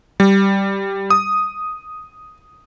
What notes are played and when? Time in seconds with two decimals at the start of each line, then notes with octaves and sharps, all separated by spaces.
0.20 G3
1.10 D#6